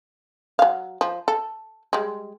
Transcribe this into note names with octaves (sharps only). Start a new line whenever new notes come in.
F#3 F5
F3
A4
G3 G#3